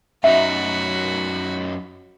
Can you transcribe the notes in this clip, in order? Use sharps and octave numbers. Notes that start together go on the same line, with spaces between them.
F#2 D#4 F#4 E5 B5